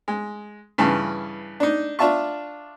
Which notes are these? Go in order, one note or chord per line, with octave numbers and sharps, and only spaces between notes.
G#3
G2 C#3 E3 A5
D4 D#4
D4 F4 E5 A5 C#6